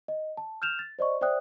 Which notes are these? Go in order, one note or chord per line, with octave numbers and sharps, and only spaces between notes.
D#5
A5
F6 G6 E7 F7
A6
C5 D5 D#5 C#6
C5 D5 E5 G5 D#6 F#6